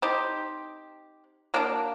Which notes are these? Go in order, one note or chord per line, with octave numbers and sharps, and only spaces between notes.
C4 D#4 G4
F#3 A#3 D4